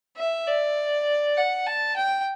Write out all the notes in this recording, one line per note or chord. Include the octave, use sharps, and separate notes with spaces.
E5
D5
F#5
A5
G5